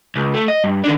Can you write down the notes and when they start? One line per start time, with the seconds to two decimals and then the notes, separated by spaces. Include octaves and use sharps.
0.16 C#2
0.34 A3
0.48 D#5
0.64 G2
0.84 D#3 D4